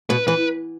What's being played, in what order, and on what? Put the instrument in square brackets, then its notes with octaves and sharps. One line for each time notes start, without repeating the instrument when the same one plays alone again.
[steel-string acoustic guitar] B2 [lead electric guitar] B4
[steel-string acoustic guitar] E3 [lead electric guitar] B4